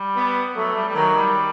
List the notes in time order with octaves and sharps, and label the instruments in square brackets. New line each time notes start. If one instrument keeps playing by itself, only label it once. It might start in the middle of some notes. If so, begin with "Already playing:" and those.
Already playing: [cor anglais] G3
[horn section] B3
[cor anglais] F#3 [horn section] A3
[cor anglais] G3
G3
[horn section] D#3 [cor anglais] F#3
[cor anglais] G3